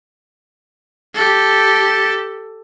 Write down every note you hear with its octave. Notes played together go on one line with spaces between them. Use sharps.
G4 A4